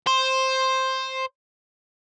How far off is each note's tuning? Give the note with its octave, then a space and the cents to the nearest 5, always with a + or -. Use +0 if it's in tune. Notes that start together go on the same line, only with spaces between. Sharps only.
C5 +10